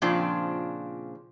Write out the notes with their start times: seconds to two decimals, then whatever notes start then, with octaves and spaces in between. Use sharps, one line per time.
0.02 A#2 C#3 F3 C4 D4 F4